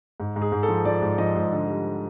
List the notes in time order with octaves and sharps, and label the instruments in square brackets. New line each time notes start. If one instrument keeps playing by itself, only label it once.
[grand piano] G#2
G#2
G#4
G#2
A4
F3
F3 D5
G#2
F3 D#5
G#2
D3
G3